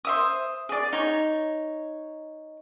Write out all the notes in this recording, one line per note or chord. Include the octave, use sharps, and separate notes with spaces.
C5 E5 D#6
G#4 D5
D#4 C#5